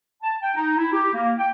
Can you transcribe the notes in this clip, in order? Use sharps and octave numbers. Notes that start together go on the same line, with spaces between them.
A5
G5
D#4
E4
G4
A#3
G5